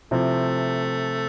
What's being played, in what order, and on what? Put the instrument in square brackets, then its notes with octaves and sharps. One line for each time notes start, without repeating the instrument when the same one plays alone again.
[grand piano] C3 F3 C4 E4 [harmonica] A3